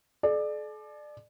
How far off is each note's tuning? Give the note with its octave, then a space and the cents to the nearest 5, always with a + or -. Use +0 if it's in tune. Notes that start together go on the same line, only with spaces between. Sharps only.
A4 -45 D5 +25